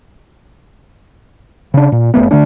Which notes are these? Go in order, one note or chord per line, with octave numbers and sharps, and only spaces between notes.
C#3 D4
A#2
F#1 A2 A3 B3
D3 A3 D4